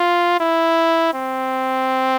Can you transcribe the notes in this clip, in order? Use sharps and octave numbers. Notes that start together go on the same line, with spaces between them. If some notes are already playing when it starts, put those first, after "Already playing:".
Already playing: F4
E4
C4